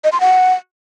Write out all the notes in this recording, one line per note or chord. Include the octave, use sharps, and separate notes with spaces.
D#5
C6
F#5